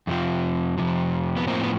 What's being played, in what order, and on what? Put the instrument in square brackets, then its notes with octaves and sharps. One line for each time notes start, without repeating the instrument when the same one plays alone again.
[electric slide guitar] F2 C3 F3
F2 C3 F3
B3
A2 F3 A#3 C4
B3